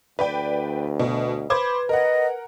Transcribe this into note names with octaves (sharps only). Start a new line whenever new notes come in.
D2 B4 D5 G5
B2
B4 C5 B5 D6 G#6
A#4 D#5 F#5